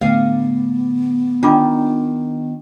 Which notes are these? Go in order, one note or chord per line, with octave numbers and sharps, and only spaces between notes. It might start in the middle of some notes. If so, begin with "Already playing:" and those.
A2 D3 A3 B3 F5
D#3 D4 F4 D6